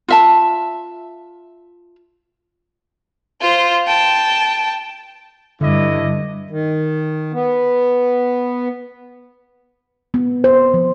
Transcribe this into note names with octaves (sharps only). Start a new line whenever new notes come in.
F4 E5 A5
F4 C5
G5 A5
G2 D3 E4 D#5 D6
D#3
B3
B3
C5
F3